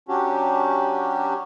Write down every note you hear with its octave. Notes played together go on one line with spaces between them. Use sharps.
F#3 C#4 D4 F#4 G4